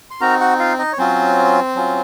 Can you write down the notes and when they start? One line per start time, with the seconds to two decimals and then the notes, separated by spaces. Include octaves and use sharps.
0.11 C6
0.21 C4 D#4 F#4 A#4 A#5
0.40 F#4 F#5
0.59 F4 F5
0.79 D#4 D#5
0.93 C#5
0.98 F#3 C4 C#4 F4 C5
1.75 F#3 C#4 F4